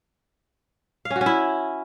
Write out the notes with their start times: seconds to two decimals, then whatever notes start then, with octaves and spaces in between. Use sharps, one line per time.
1.05 F5
1.11 C#4
1.16 F#4
1.21 C#4
1.26 E4